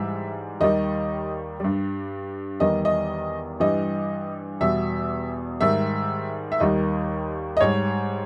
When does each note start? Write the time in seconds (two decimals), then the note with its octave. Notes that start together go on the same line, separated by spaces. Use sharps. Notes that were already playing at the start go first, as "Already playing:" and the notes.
Already playing: G#2 E3 G3 E5
0.60 D#2 D#3 G3 D#5
1.60 G2 G3
2.60 E2 D#3 G3 D#5
2.85 D#5
3.60 G2 E3 G3 D#5
4.60 E2 B2 G3 E5
5.61 G#2 D#3 G3 E5
6.52 E5
6.60 D#2 D#3 G3 D#5
7.57 D#5
7.61 G#2 G3 C#5